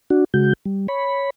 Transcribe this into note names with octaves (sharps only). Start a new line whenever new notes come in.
D4 F#4
C#3 G#3 F#4 G6
G3
C#5 B5